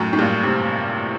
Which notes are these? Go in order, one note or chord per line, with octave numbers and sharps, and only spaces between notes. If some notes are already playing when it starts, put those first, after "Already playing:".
Already playing: F#2 A2
A2
G2 A#2
A2 C3